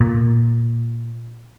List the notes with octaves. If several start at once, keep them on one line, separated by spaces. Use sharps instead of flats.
A#2